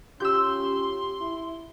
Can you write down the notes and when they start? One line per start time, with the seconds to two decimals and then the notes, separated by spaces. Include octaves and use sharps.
0.20 C#4 F4 G4 C6 E6 G6
1.21 E4